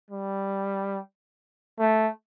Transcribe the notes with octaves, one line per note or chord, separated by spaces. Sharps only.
G3
A3